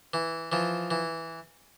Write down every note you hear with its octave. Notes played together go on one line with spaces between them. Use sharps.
E3
E3 F3
E3